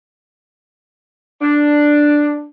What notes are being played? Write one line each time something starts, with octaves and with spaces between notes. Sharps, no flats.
D4